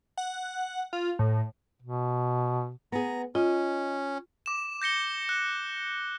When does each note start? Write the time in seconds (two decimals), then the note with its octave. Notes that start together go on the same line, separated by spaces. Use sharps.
0.17 F#5
0.93 F4
1.19 A2
1.82 B2
2.92 B3 G#4 A#5
3.35 C#4 F4 D#5
4.46 D6 E7
4.82 G6 A#6 C#7 G7
5.29 F#6